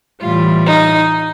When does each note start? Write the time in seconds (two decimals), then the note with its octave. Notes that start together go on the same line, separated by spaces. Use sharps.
0.22 A2 E3 G3 F4
0.67 D#4